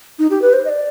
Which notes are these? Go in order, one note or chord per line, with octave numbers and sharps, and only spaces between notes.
D#4
G4
B4
C5
D#5
D5